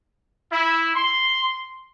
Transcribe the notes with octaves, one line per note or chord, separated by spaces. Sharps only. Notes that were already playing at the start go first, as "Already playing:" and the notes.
E4
C6